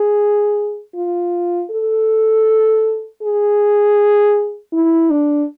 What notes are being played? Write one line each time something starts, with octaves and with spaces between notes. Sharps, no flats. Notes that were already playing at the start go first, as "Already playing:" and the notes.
Already playing: G#4
F4
A4
G#4
E4
D4